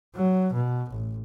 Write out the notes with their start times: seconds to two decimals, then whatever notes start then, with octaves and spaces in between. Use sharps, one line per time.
0.15 F#3
0.53 B2
0.90 A1